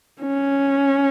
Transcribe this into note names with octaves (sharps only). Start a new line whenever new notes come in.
C#4